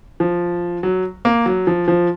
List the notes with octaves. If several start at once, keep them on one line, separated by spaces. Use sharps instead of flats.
F3
F#3
A#3
F#3
F3
F3